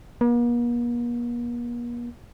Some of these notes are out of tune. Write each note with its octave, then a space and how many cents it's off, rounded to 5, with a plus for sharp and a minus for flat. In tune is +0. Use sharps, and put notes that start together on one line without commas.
A#3 +45